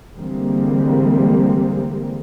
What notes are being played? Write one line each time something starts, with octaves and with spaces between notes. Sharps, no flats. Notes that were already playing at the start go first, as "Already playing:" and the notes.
D3 E3 G3 G#3 A#3 C4